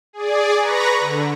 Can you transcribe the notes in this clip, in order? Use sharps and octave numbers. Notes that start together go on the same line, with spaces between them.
G#4 D5
B4 A#5 B5 C#6 A#6
D3